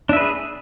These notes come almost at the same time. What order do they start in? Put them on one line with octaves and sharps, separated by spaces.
D4 E5 B4 G#4